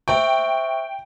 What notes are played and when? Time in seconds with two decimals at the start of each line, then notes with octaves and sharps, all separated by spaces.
0.08 C5 E5 G5 C#6